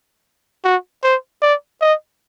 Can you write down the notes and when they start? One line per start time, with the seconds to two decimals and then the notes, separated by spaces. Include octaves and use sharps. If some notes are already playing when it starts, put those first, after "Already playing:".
0.64 F#4
1.03 C5
1.42 D5
1.81 D#5